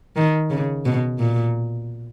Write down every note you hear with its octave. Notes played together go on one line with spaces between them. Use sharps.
D#3
C#3
B2
A#2